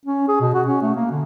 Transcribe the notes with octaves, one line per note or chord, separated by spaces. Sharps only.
C#4
G#4
B2
F#4
C#4
A3
A#3
D3